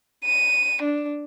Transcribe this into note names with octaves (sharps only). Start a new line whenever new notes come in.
D#7
D4